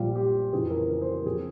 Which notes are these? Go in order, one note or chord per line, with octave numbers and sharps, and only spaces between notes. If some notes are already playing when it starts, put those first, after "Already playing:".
Already playing: A#1 A#2 G3 F4
G4
F2 C#3 E3 G#4
A#4
A#4
C5
A#4
F3 C4 G#4